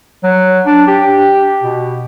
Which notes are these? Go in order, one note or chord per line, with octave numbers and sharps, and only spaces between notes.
F#3
D4
G4
B2